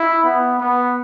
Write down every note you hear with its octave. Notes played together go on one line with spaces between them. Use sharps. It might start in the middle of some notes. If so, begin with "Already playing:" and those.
Already playing: E4
B3
B3